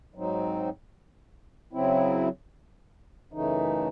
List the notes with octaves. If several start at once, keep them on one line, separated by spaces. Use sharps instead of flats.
G#2 F#3 C4 D#4
C#3 F#3 C4 E4
F#2 C#3 E3 A3 D#4